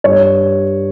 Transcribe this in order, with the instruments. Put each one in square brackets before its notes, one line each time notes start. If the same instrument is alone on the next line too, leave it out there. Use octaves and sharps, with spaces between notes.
[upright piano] G2 G3 C#5